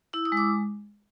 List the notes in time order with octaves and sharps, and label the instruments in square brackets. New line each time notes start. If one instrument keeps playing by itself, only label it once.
[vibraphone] E4 E6
D#6
G#3
D6